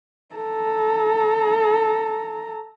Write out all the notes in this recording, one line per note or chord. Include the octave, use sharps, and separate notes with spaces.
A4 A#5